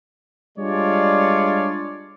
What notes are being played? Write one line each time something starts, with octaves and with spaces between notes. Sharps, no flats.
G3 G#3 D4 F4 C#5 D5